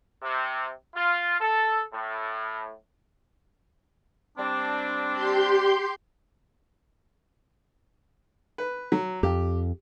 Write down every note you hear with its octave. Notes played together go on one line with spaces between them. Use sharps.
C3
F4
A4
A2
G3 C4 D4
G4 C6 G6
B4
F#3
F2 G4